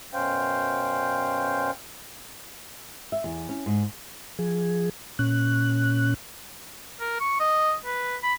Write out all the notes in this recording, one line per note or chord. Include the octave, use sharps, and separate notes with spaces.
F#2 B2 C#4 C5 F5 G5
E5
E2
C#4
G#2
F3 G#4
A#2 C#4 F#6
A#4
C#6
D#5
B4
B5